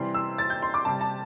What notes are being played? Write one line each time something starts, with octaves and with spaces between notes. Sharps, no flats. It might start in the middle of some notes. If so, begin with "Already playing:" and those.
Already playing: C3 E3 G3 C6
E6
A6
G6
C6
D6
C3 G3 A5
A5